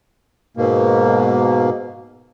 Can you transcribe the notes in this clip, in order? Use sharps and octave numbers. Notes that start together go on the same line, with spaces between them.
G#2 B2 A#3